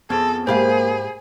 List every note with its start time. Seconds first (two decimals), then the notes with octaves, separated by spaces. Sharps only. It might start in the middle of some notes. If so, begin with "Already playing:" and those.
0.10 F2 B3 G#4 A4
0.47 G#2 A#3 G4 G#4 C5 F5 B5